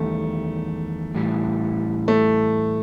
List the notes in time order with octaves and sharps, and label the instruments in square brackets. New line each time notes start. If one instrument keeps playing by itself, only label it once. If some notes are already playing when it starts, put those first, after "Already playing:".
Already playing: [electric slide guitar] E2 D#3 G3 [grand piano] A3
[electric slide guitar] A2 E3 G3
[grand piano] A3